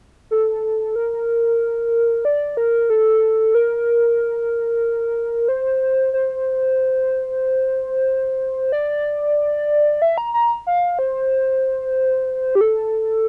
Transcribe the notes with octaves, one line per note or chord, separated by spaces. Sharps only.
A4
A#4
D5
A#4
A4
A#4
C5
C5
D5
E5
A#5
A#5
F5
C5
G4
A4